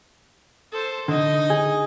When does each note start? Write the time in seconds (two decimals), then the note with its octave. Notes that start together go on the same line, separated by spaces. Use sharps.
0.72 A4 C5
1.08 D3 D#4 D#5
1.50 G#4